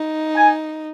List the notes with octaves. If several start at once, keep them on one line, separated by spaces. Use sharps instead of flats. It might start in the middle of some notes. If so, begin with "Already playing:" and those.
Already playing: D#4
G#5